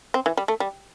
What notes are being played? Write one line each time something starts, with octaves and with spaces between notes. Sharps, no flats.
C4
E3
G3
A3
G3